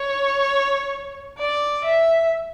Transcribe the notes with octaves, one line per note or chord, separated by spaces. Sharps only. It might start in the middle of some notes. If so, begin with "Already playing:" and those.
Already playing: C#5
D5
E5